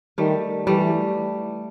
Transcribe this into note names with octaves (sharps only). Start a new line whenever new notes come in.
D#3 G3 A3
E3 G3 A3